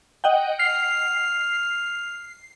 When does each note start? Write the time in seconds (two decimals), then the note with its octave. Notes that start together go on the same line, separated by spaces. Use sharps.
0.24 D#5 F#5 G5
0.60 F6 C7